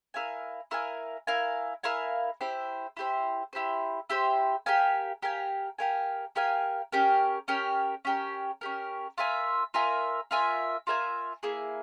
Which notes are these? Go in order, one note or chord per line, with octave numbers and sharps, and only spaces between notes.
E4 A#4 F5 G#5
E4 A#4 F5 G#5
E4 A#4 F5 G#5
E4 A#4 F5 G#5
E4 G4 C5
E4 G4 C5
E4 G4 C5
E4 G4 C5
G4 A#4 F5 G#5
G4 A#4 F5 G#5
G4 A#4 F5 G#5
G4 A#4 F5 G#5
C#4 G4 A#4
C#4 G4 A#4
C#4 G4 A#4
C#4 G4 A#4
F4 A#4 E5 G#5
F4 A#4 E5 G#5
F4 A#4 E5 G#5
F4 A#4 E5 G#5
A#3 E4 G#4